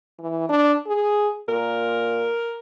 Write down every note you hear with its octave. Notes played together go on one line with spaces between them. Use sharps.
E3
D4
G#4
A#2 A#4